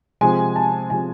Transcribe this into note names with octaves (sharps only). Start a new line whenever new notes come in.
C3 F3 G#3 G#5
A5
C3 F3 G#3 G#5